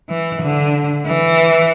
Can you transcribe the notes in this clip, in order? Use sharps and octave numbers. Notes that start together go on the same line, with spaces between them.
E3
D3
E3